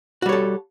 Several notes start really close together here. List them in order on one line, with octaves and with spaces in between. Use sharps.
F#4 G3 C#5 A4